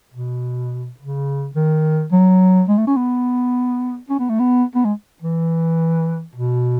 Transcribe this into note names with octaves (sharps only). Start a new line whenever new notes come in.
B2
C#3
D#3
F#3
G#3
A3
C#4
B3
C#4
B3
A3
B3
B3
G#3
E3
B2